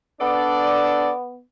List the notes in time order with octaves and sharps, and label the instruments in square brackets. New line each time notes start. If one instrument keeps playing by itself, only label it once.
[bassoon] B3 [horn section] D4 A4 D5